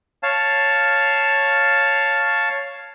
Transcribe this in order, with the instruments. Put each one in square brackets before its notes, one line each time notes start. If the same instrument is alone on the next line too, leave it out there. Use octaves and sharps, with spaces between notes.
[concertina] C#5 F5 A5